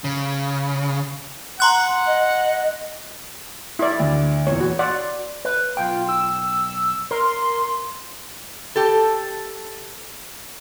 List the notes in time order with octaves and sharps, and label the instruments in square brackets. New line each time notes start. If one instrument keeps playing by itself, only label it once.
[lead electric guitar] C#3
[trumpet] F#5 [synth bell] A#5 C6 F#6
[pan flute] D#5
[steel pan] E4 D5
[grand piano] D2
[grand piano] E2 A#2 [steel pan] C#5
[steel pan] F#4
[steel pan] D5 F#5 [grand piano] C6
[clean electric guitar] B4
[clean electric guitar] B1 G5 [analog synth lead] F4
[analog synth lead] E6
[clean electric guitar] A#4 [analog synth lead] C6
[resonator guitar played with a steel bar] G4 A4